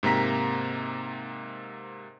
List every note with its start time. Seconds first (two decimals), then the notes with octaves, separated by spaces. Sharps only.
0.03 G#2 C3 A#3 A#5 B6